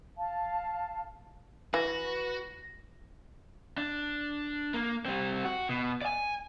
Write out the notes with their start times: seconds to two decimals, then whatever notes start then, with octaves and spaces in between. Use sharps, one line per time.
0.17 F5 A5
1.74 E3 F#4 B4 A#6
3.78 D4
4.74 A#3
5.05 G3 C4
5.45 F#4
5.69 B2
6.02 D5 G#5